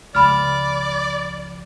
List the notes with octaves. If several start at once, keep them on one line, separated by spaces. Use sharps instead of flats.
C#2 F3 D5 B5 F6